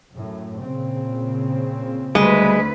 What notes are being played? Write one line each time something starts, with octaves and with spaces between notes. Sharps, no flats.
F#2 A2
A#2 C#3 C4
D2 G3 G#3 B4